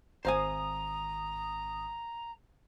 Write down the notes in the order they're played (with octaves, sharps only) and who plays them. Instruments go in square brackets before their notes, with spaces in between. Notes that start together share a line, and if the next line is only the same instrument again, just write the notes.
[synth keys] G#1 D#6 [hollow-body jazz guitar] C5 F5 G#5 [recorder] A#5